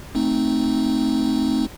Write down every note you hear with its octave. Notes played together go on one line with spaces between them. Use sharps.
A3 C4 D#4